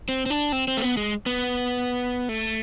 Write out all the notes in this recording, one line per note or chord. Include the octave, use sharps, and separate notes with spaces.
C4
C4
D4
C4
C4
A3
B3
G#3
B3
A3